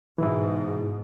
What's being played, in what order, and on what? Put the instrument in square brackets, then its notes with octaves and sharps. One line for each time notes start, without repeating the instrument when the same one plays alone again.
[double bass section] G#2 B2 [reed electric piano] E3 E4